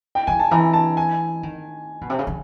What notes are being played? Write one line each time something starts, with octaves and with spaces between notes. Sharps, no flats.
G5
D3 G#5
A5
E3 A#5
A5
G#5
D#3
B2
C3
C#3
D3